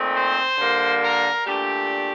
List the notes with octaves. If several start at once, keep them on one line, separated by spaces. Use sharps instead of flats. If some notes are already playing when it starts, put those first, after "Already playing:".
Already playing: A#2 A3 C4 D#4
C5
D3 G3 A#3
A#4
A#2 A3 D4 G4